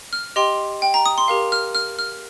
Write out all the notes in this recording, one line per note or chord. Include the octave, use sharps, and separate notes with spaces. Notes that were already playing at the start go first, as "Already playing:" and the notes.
F6
G4 D#5 G5 C6
G5
A#5
D#6
C6
G4 A#4 F5
F6
F6
F6